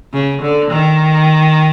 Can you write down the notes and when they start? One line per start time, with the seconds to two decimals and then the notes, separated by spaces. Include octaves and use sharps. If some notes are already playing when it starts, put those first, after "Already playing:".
0.13 C#3
0.42 D3
0.71 D#3